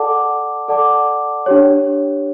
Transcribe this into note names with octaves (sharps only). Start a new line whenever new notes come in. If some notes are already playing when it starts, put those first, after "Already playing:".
Already playing: A4 D5 F#5 A5 D6
A4 D5 F#5 A5 D6
D4 G4 C#5